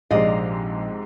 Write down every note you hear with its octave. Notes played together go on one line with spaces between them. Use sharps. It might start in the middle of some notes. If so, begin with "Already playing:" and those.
A#1 G#2 C3 G#3 D5 D#5 F5